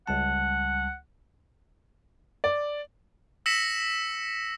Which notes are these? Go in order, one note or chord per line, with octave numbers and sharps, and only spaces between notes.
C#2 G3 F#5 A5
D5
E6 A#6 B6 C#7 E7 F#7